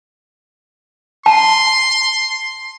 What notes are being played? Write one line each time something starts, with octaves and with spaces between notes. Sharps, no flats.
A5 C6